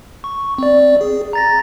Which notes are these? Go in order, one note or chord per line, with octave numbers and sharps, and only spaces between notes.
C#6
C4 D5
G#4
A#5 A6 A#6